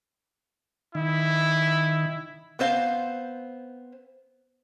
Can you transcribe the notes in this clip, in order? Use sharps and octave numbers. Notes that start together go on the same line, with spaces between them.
D#3 E4
B3 C4 C5 F5